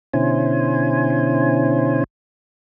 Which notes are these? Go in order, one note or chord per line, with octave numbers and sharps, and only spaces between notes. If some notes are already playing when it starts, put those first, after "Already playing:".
B2 D3 C#4 E4 C5 G#5